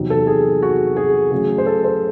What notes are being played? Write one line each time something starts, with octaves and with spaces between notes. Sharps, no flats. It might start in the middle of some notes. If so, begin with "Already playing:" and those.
Already playing: E2 C3 F#3 C4 D#4
A4
G#4
F#4
G#4
C#3 F#3 A3 G#4
C5
A4
C5